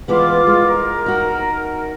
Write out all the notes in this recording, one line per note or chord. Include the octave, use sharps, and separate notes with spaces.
E3 G#3 B3 F4 D6
G#3
A#4
D#4 F#4